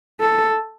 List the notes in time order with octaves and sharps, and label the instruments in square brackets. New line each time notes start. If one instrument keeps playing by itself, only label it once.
[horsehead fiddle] A4